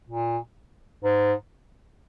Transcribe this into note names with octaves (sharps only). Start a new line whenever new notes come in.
A#2
G#2